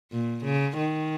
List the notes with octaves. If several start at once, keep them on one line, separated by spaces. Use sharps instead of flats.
A#2
C#3
D#3